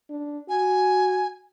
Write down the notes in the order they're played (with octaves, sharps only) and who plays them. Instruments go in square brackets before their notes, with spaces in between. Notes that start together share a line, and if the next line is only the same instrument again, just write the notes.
[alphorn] D4
[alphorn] F#4 [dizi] G#5